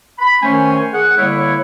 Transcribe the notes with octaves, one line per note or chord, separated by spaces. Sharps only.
B5
D#3 A3 C#4 C5 C#5 G#5
G#4 F#5
D3 G3 A#3 E4 B4 C#5